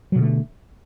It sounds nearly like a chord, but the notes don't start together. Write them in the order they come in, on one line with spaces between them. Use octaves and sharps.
F#3 B2 D3 A3